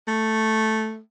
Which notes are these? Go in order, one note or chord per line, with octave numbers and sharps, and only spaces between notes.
A3